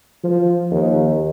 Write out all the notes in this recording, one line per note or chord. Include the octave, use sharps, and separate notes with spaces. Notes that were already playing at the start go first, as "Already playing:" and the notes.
F3
D#2